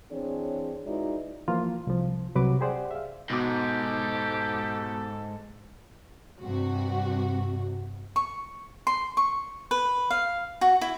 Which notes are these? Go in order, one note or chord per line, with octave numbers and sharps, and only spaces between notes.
E3 C4 D4 G#4 C#5
G#3 D#4 E4 F#4 B4 D5
E3 F3 A#3 F4
C2 F3
C2 C3 F#3 B4 D6
G4 G#4 C5 D5 F#5
E5 F5
G#2 B2 G4 A4 D6
G2 C3 F#4
C#6
C6
C#6
B4
F5
F#4
E4